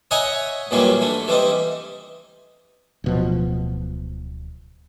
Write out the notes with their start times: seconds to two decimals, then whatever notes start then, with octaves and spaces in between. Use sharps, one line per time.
0.11 C#5 D#5 E5 F#5 G#5 A#5
0.71 D#2 A#2 E3 F#3 G3 A#3
1.01 D3 A3
1.28 E3 G3 C4 D#4
3.04 D1 B2 F3